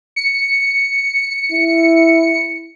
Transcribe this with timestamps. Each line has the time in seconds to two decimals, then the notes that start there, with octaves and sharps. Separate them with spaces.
0.16 C#7
1.52 E4